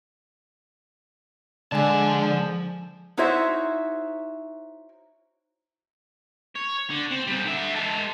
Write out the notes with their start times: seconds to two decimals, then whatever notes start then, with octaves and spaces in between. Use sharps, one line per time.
1.72 D3 F3 G#3 D5 G#5 A5
3.17 D#4 E4 F#4 C5 C#5 E5
6.56 C#5
6.90 D3
7.11 C4
7.28 G3 D#4
7.45 D3 E5
7.75 G#3 A5